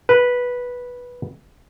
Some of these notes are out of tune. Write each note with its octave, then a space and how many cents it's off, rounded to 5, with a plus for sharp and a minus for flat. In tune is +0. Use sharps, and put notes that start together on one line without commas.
B4 -10